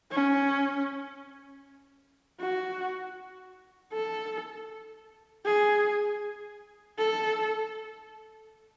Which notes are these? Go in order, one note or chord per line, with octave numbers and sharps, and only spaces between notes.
C#4
F#4
A4
G#4
A4